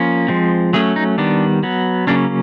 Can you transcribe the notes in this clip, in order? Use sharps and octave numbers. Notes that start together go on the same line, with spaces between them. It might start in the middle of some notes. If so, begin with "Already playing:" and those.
Already playing: F3 A#3 C#4
F3 G#3 C4
F#3 A3 C#4 G#4
D#4
D#3 G3 B3 D4
F#3 B3
C#3 F#3 A#3 C#4 D4